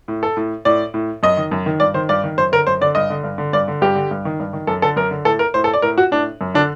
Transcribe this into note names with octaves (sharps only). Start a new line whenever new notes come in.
A2
A4
A2
A2 D5
A2
F#2 D#5
D#3
F#2
D#3
G2 D5
D#3 C5
G2 D5
D#3
F#2 C5
D3 A#4
F#2 C5
D3 D5
G2 D#5
D3
G2
D3
G2 D5
D3
G2 G4
D3
G2
D#3
G2
D#3
F#2 A4
D3 A4
F#2 A#4
D3
A2 A4
A#4
A2 C5
A4
D5
A2 A#4
F#4
A2 D4
F#2
D3 D4